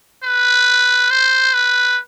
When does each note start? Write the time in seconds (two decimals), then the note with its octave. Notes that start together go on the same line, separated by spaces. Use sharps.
0.24 B4
1.11 C5
1.54 B4